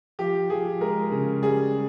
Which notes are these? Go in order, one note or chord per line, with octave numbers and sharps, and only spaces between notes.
F3 G4
F3 G#4
G#3 A#4
C#3
G3 G#4